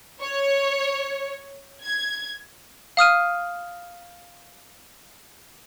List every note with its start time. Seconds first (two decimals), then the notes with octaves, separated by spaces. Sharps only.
0.22 C#5
1.83 G#6
2.97 F5 D#6 F6 D#7